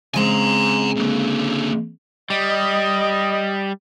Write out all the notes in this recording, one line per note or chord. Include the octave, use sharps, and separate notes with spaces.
C#3 G#3 C4 G#5 A#5
D3 A#3
G3 D#5